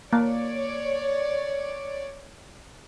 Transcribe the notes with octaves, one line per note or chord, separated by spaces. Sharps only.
A#3 C#5 D5